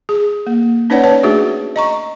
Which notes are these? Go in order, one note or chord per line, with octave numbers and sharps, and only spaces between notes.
G#4
A#3
C#4 D#4 B4 C#5 D5 F#5
B4 C#5 A5
A3 D4 F#4 G#4
D#5 A#5 C#6